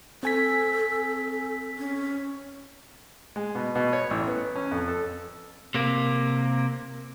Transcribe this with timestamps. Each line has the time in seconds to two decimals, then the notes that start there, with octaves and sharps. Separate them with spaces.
0.23 C4 A4 G#5 B6
1.78 C#4
3.36 G#3
3.55 B2
3.75 B2
3.93 C#5
4.10 A1
4.28 B3
4.55 C#4
4.71 F2
4.88 A4
5.75 C3 A#3